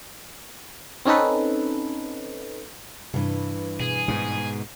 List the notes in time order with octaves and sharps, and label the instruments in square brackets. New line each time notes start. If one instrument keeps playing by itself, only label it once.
[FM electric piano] C4 C#4 D#4 A4 B4
[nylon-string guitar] G2 E3 [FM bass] C3
[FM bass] B2 [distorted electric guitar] G#4
[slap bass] G#2 B2 [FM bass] G#3